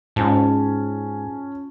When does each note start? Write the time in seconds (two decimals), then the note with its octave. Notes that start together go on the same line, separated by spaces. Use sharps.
0.16 G#2 C#4 F4 A5